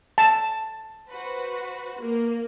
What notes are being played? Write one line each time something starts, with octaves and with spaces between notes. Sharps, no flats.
A5
F#4 B4 C5
A#3